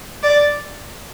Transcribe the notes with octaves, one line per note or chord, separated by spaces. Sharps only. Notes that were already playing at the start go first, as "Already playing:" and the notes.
D5